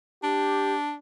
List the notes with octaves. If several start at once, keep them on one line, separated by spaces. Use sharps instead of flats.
D4 G4